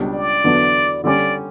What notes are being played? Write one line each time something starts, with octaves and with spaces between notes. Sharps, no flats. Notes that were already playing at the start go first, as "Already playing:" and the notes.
Already playing: C#2 B2 G3 D4
D5
E2 D3 F#3 B3 D4
D3 G3 C#4 D5